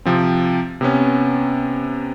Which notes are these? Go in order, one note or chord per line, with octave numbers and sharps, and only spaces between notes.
C3 F3 C4
C3 B3 C#4